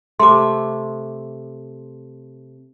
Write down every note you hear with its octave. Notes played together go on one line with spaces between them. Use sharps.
C3 A3 C6 D6